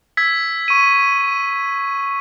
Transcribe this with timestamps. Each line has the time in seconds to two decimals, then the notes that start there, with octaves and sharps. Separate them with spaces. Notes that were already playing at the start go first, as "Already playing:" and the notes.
0.17 E6 G#6 B6
0.68 C#6 D#7